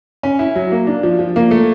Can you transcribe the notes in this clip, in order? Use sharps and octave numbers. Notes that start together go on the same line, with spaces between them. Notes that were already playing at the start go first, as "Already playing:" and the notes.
C#4
E4
F#3
A#3
D4
F3
F3
A#3
A3